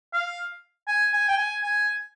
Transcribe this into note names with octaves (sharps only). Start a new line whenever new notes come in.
F5
G#5
G#5
G5
G#5
G#5